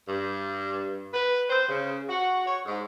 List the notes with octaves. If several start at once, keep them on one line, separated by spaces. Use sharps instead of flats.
G2
B4
C5
C#3
F#4
C#5
G#2